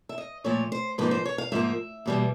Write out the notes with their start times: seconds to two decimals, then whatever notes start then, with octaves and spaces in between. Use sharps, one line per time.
0.09 E5
0.18 D#5
0.44 A#2 F3 A3 C#5
0.72 C5
0.98 G#2 F3 A#3 D#4 B4
1.11 C5
1.25 C#5
1.38 F5
1.52 G#2 F3 A#3 D#4 E5
2.06 E2 B2 G3 A#3